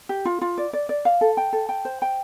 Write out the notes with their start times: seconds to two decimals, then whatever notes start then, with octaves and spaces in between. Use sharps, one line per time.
0.09 G4
0.25 F4
0.41 F4
0.58 D5
0.73 D5
0.89 D5
1.05 F5
1.21 A4
1.37 G5
1.53 A4
1.69 G5
1.85 C5
2.02 G5